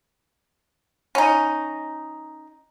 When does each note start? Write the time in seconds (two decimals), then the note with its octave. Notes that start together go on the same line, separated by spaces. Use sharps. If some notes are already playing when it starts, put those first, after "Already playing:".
1.15 C#4 D#4